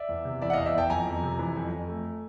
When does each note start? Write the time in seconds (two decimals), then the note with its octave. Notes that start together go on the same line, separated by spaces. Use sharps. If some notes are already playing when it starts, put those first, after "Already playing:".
Already playing: D5 E5
0.09 E2
0.25 C3
0.42 E3 D5 E5
0.50 F#5
0.53 E2 D#5 F5
0.66 D5 E5
0.75 E2 G5 A5
0.90 F2 G#5 A#5
1.07 F2
1.23 C3
1.39 E3
1.56 F2
1.71 F2
1.88 A3